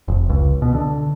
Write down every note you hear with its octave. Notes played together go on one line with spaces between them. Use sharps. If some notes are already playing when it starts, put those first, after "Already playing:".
F1
C#2
B2
D3